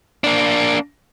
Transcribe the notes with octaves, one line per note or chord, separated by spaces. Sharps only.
A#3 D4